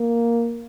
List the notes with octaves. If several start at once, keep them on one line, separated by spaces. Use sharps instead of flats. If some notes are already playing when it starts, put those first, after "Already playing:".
Already playing: A#3